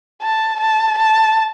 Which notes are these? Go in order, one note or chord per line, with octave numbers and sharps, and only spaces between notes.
A5
A5
A5